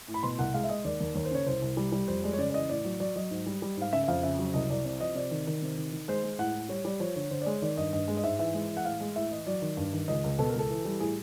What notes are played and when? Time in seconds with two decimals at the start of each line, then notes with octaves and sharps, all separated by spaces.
0.08 A2
0.14 B5
0.23 B2 C6
0.38 C2 F#5
0.54 G#3 F5
0.64 E5
0.69 G#3 D#5
0.84 D#2 D5
1.00 D#2
1.15 D#2 C#5
1.25 C5
1.31 C#3 C#5
1.46 C2 C5
1.62 C2
1.77 G3
1.92 G3
2.08 F2 C5
2.23 G#3 D5
2.33 C#5
2.38 C#3 D5
2.50 D5
2.54 E3 D#5
2.69 A2 D5
2.84 F#3
3.00 F#3 D5
3.16 F#3 D#5
3.31 G#2
3.46 G3
3.62 G3
3.77 G#2 F5
3.92 C#3 E5
4.04 E5
4.08 F2 F5
4.23 C#3 E5
4.39 F#3
4.54 C2 D#5
4.70 C2 D5
4.85 C3 D5
5.00 F3 D#5
5.15 C3 D5
5.31 D#3
5.47 D#3
5.62 C3
5.77 D#3
5.92 D#3
6.08 G#3 C5
6.23 G#3
6.39 A2 F#5
6.54 A2
6.69 G3 C#5
6.85 G3 D5
7.00 F3 C#5
7.16 D3 C#5
7.31 D3 C5
7.42 D5
7.46 G#3 C#5
7.62 D#3 D5
7.77 G2 D#5
7.93 G2 D#5
8.08 G#3
8.17 D#5
8.23 G#2 E5
8.39 E3 E5
8.54 G#3
8.70 E3
8.77 F#5
8.85 A2 F5
9.00 G#3
9.16 A2 E5
9.31 E3 D#5
9.47 F#3 D5
9.62 D#3
9.77 G2
9.93 D#3
10.08 C#2 D#5
10.24 C#2
10.39 B2 A4
10.49 C#2 A#4
10.59 A4
10.70 E3
10.85 G3
11.00 A2 G#4